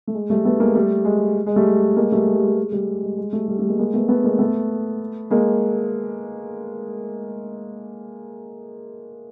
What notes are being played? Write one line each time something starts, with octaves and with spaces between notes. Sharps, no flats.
A3
G#3
G3 A3
A3 B3
G#3 A#3
G3 A3
G#3
G#3
G3 A3
G#3 A#3
G3 A3
G#3
G3
G3
G#3
G3 A3
G#3
G#3
G3 A3
G3
G3 A3
G#3 A#3
G#3 A#3
A3 B3
A3 B3
G#3 A#3
A3 B3
G#3 A#3